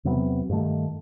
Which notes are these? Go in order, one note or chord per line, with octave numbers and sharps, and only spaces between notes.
E2 C3 F#3 B3
G2 D#3 A3